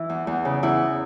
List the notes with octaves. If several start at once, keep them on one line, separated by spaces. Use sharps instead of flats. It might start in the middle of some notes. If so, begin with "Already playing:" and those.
Already playing: E3 E4
E2
E2
C#3
E2 E4